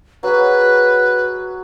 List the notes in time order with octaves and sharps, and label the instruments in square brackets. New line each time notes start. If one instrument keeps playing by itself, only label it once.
[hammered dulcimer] F#3 G#4 [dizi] B4